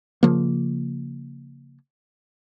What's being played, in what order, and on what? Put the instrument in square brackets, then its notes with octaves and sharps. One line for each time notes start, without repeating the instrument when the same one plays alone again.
[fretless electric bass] C#3 F3 A#3